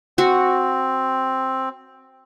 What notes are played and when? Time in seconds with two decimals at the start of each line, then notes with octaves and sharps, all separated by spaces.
0.18 C4 F#4